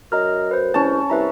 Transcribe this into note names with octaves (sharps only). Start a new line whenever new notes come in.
F#2 D#5 A#5 F6
B4 C5
C2 C#4 A5
C2 B4 E5 A#5